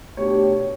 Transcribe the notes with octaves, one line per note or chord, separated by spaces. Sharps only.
B2 A3 D4 G4 C#5
C#5